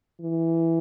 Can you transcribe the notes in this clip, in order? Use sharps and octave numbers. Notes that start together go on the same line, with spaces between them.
E3